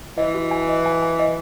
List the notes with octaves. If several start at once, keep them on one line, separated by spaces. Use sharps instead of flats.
E3 D#5
F#4
G#5
D#5
G#5
G#5
D#5